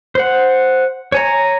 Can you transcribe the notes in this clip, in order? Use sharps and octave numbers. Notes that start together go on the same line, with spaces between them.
C5 F#5
C#5 G#5 A#5